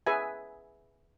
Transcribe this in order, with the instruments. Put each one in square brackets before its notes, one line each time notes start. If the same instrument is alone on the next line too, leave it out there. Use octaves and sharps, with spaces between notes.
[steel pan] G#4 B4 E5 G#5